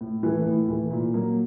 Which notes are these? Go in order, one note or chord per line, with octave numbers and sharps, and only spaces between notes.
A2
E3 A3
A2
E3 A3
A#2
F#3 A#3